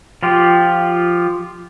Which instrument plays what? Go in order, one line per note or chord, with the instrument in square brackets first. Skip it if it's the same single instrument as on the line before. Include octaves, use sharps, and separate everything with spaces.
[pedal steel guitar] F3 F4 G4